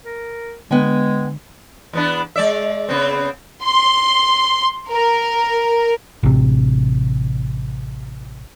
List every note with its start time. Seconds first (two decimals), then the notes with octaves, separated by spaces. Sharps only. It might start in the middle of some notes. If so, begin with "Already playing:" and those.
0.05 A#4
0.71 D3 G#3 B3 G5 G#5
1.93 E2 B3 D4
2.36 G#3 D5 E5
2.89 C#3 B3 C4
3.62 C6
4.92 A#4
6.23 A1 C3